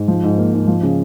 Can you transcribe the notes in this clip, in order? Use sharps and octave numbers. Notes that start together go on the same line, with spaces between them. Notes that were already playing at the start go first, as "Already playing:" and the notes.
Already playing: G#2
F3
G#2
A#3
G#2
F3
C#3